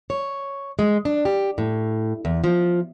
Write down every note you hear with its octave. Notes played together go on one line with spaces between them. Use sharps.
C#5
G#3
D4
G4
A2
E2
F3